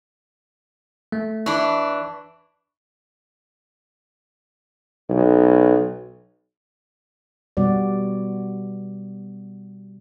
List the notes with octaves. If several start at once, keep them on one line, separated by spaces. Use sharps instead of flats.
A3
E3 D4 C#6
B1
B2 G3 B3 F#4 D5